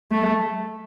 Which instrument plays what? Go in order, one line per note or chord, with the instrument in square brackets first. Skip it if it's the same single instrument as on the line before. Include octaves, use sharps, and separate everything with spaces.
[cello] A3